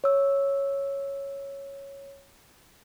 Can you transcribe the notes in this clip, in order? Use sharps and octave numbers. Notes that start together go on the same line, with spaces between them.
C#5 E6